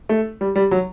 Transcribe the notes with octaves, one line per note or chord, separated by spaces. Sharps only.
A3
G3
G3
F#3